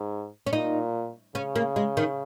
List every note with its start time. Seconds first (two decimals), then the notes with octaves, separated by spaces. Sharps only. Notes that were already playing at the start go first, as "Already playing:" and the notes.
Already playing: G#2
0.46 C#4
0.53 A#2 D#4
1.35 C#3 C#4
1.56 A#3
1.76 G#3
1.97 D#3